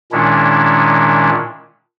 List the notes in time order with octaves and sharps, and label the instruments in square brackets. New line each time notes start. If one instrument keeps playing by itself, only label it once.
[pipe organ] A#2 D#3 G#3 C#4 D4 E4